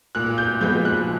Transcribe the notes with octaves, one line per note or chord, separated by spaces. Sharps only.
A#2 F#6
G6
F3 G#3 B3 G6
F#6